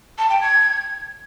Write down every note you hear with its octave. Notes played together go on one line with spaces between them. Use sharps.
A5
G5
G#6